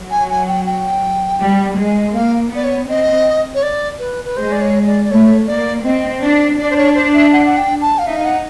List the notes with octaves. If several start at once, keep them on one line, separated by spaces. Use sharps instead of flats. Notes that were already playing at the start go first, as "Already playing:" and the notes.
Already playing: F#3
G#5
G#5
G5
G5
G3
G#3
A#3 F5
B3 D5
C#5
C4 D#5
C#5
D5
B4
B4
G#3 C5
D5
C#5
D5
D5
A3 C#5
A#3 D5
C4 D#5
D4 D5
D4 D5
C5
C#5
C5
E5
F#5
F#5
G5
A5
F5
D#4 E5
F5
F#5